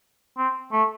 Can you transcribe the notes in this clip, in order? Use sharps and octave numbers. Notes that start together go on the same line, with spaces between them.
C4
A3